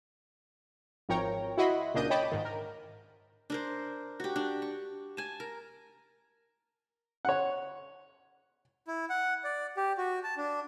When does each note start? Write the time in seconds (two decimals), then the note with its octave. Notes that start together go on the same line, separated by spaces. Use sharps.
1.09 G#1 F3 A#4 C#5 G5 A#5
1.57 E4 F#4 D#5 B5 C6
1.94 C#2 A#2 D4 D#5 G6 D#7
2.10 C#5 D#5 G5 A5 B5 D6
2.32 G#2 D#3
2.45 A#4
3.50 D4 A#4 C5
4.20 F#4 G4
4.36 D4
4.62 C#6
5.17 G#5 A5
5.40 A#4
7.25 C#5 F#5
8.87 E4
9.10 F#5
9.44 D5
9.77 G4
9.98 F#4
10.23 A5
10.37 D4